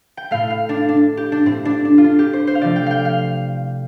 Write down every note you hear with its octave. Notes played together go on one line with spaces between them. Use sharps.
G5
A2 A3 F5
F5
D4
D4
G4
D4
A2 A3 C4
D4
D4
F4
D4
G4
C5
C5
F5
C3 F3 A3 D5
G5
F5 G5
F5